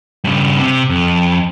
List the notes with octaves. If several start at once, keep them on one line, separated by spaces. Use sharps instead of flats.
G2 C#3
C3
F2